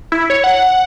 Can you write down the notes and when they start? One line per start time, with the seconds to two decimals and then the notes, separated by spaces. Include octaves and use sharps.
0.12 E4
0.30 C#5
0.44 F#5